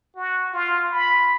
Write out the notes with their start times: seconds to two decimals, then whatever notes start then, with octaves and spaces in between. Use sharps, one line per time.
0.16 F#4
0.54 F4
0.91 B5